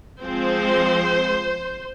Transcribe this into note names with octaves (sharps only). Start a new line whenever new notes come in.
F3 G#3 C4 C5